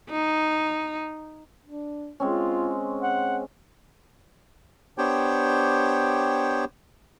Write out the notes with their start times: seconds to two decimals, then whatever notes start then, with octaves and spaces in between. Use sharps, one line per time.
0.10 D#4
1.65 D4
2.20 G#3 C4 C#4 F4
3.01 F#5
4.98 B3 D4 G4 C5 C#5 G5